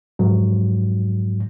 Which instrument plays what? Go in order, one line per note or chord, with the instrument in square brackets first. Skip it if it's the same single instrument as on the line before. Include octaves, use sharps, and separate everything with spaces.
[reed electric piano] F2 G#2 F#3